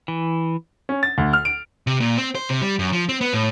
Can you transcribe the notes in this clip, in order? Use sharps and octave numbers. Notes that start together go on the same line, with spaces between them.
E3
C#4
A6
D2
F6
D7
C3
A#2
C4
C5
C3
G3
F#2
F3
C4
B3
A2